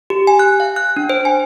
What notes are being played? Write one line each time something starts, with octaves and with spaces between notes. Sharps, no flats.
G4
G#5
F#6
F5
F#6
D4
C5
G#5